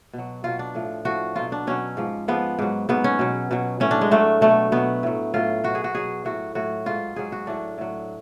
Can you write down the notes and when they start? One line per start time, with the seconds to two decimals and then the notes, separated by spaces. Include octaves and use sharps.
0.13 B2 F#3
0.44 B2 F#3 F4
0.59 D4
0.75 A2 F3
1.05 A2 F3 F#4
1.36 B2 F#3 F4
1.52 D4
1.67 B2 F#3 C#4
1.97 G#2 F3
2.28 G#2 F3 B3
2.59 G#2 F#3
2.89 G#2 F#3 B3
3.04 C#4
3.19 B2 F#3
3.51 B2 F#3
3.80 A2 F#3 C#4
3.91 D4
4.01 G#3
4.11 A2 F#3 A3
4.41 B2 F#3 A3
4.72 B2 F#3 B3
5.03 A2 F#3
5.34 A2 F#3 F4
5.64 B2 F#3 F#4
5.75 G#4
5.84 F#4
5.95 B2 F#3 G#4
6.25 A2 F#3 F#4
6.55 A2 F#3 F#4
6.86 G#2 F#3 F4
7.16 G#2 F#3 G#4
7.32 F#4
7.47 A2 F#3 D4
7.78 A2 F#3